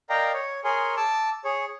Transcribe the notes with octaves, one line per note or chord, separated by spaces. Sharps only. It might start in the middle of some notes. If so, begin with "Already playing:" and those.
A#4 D5 D#5 F5 G5 A#5
C#5
G#4 A#4 C#5 G#5 C6
A5 D6 E6
G#4 C#5